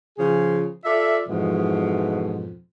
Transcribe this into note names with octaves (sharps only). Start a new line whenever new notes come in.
C#3 F3 G#4
F4 A4 D5 E5
F2 G#2 B2 E3 F3